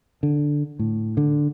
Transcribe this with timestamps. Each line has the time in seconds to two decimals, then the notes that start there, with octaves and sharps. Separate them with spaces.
0.23 D3
0.79 A2
1.17 D3